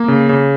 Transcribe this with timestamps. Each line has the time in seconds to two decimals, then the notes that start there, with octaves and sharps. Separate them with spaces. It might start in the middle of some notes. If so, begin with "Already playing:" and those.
Already playing: A#3
0.08 C#3
0.29 C#3